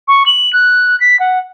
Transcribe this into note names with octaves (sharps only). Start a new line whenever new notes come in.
C#6
F#7
F#6
B6
F#5